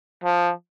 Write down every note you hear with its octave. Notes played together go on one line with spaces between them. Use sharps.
F3